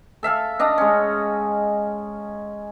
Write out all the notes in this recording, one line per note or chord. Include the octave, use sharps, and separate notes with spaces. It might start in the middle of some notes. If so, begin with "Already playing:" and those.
A4 E5 F5 A5
D4 D#5 A#5
G#3 C#4